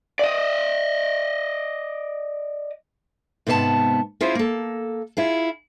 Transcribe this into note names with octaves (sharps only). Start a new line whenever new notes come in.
D5 D#5
G#2 C3 B3 C5 A5
C#4 E4 F4 G#4 C5
A#3 A4
E4 F4 G#4